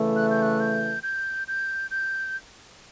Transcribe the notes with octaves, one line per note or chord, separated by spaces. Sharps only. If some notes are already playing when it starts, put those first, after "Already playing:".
Already playing: C#3 E3 A3
F#6
G6
F#6
G6
G6
G6
G6